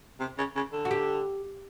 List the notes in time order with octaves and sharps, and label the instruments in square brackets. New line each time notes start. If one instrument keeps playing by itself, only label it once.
[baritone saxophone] C3
C#3
C#3
D3
[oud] F#4
G4